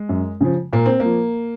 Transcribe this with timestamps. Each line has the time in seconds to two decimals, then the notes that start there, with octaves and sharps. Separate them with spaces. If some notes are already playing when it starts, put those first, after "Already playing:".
Already playing: G#3
0.09 F#2
0.41 C#3 F3
0.73 A#2 A#3
0.86 C4
1.00 A#3
1.05 F3